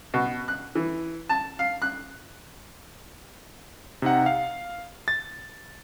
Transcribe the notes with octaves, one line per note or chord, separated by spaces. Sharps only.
B2
F#6
E3
A5
F5
F#6
C3 D#4 F#5
F5
A6